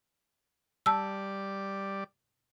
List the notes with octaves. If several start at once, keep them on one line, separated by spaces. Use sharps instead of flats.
G3 D5 A5 E6